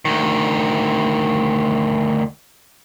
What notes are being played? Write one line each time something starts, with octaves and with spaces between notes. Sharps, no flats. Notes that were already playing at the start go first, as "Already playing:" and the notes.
D2 D#3